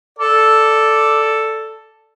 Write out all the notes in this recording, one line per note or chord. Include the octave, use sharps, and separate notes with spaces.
A4 D5